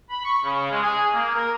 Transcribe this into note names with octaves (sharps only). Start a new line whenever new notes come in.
B5
C#6
C#3
G#3
G#4
A#3
A#4